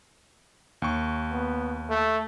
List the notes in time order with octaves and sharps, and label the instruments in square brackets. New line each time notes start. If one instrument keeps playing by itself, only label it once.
[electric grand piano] D#2 C#6
[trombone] B3
A3